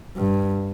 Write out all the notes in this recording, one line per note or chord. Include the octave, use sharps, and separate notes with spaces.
G2